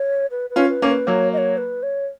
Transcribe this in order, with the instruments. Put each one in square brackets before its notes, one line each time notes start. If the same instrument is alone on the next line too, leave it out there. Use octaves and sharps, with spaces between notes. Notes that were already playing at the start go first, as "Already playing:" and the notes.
Already playing: [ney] C#5
B4
B4
[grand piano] C#4 F4
[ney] B4
[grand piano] A#3 C#4
[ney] B4
[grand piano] F#3 A#3 [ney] C#5
[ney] D#5
C#5
B4
C#5